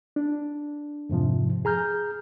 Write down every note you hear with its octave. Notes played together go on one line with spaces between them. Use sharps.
D4
F2 G#2 C3 F3
G#4 A#5 F6 G6